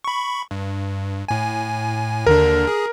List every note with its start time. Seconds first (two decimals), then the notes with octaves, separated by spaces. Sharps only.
0.04 B5 C#6
0.51 G2
1.28 A2 G#5
2.26 D#2 D3 D4 A#4
2.67 G#4